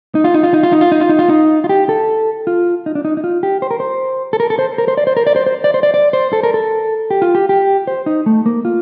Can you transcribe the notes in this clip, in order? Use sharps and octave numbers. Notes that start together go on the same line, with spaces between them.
D#4
F4
D#4
F4
D#4
F4
D#4
F4
D#4
F4
D#4
F4
D#4
F4
G4
A4
F4
D#4
D4
D#4
D#4
F4
G4
C5
A#4
C5
A4
A#4
A4
C5
A#4
C5
D5
C5
A#4
D5
C5
C5
D5
C5
D5
D5
C5
A4
A#4
A4
G4
F4
G4
G4
C5
D#4
A3
A#3
F4